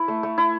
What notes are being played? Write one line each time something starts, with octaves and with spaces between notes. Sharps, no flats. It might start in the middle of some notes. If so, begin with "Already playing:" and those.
Already playing: E4
A3
A3
E4